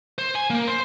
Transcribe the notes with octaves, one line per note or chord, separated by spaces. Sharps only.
C5
G#5
A#3
C5